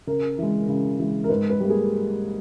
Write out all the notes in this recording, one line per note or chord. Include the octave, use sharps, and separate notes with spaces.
C#3 A#4
E3 G#3
C#3
E3 G#3
A#4
G#2 B4
B4
G3 A#3
G#4